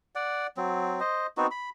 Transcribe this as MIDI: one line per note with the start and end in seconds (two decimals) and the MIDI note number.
0.15 0.47 74
0.15 0.47 78
0.57 1.00 54
0.57 1.00 60
1.00 1.27 72
1.00 1.27 75
1.37 1.47 59
1.37 1.47 60
1.37 1.47 63
1.37 1.47 66
1.51 1.70 83